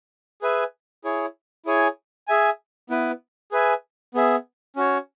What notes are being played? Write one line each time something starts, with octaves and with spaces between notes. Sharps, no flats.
G#4 B4 E5 G#5
E4 G#4 C#5
E4 G#4 C#5 G#5
G#4 E5 G#5
B3 E4 B4
G#4 B4 E5 G#5
B3 G#4 E5
C#4 F#4 C#5